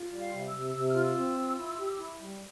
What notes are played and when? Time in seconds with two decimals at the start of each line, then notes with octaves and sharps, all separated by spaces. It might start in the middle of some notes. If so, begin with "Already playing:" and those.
Already playing: F4
0.12 G3
0.19 F5
0.33 C3
0.47 E6
0.53 C3
0.74 C3 E6
0.89 F6
0.95 F4
1.02 E6
1.15 C4
1.37 F4
1.58 E4
1.79 G4
1.99 E4
2.21 G3